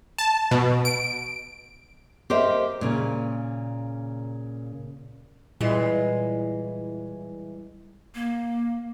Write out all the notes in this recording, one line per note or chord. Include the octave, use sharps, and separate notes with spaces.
A5
B2
D7
G4 A#4 C5 D#5 E5
A#2 C#3
A#2 E3 G3 G#3 E4 C7
A#3